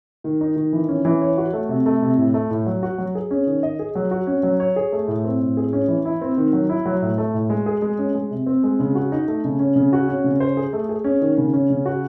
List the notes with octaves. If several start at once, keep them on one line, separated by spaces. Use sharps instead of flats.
D#3
D#4
D#3
E3
C#4
E3
C#5
F#4
A3
C3
A3
C3
A2
A3
A2
F#3
F#4
F#3
G#4
C#4
D#3
D#5
G#4
F#3
F#4
C#4
F#3
C#5
G#4
A3
A2
C4
A2
G#4
C#4
E3
E4
C4
D#3
F#3
E4
F#3
A2
A3
A2
G#3
G#4
G#3
C#4
G#3
C3
C4
G#3
C#3
F#4
D#4
A3
C#3
C#4
C#3
F#4
C#4
C#3
C5
G#4
A3
G#4
C#4
D#3
C#3
C#4
C#3
F#4